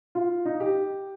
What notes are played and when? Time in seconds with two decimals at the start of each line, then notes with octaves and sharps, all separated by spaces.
0.15 F4
0.45 D#4
0.60 G4